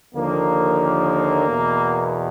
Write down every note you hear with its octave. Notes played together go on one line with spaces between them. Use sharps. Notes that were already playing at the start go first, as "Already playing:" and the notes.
D#2 D3 F3 A#3
E2 B2